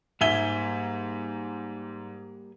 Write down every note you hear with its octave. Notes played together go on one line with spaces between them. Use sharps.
G#2 G3 A#3 E5 G#5 G7